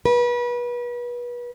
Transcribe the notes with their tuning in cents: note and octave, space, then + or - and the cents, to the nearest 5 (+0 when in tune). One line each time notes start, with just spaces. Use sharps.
B4 -30